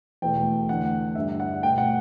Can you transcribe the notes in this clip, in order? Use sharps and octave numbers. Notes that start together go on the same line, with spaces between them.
E2 B2 A3 G5
E2 D3 A3 F#5
G2 D3 G3 E5
F#5
B2 A3 G5
F#5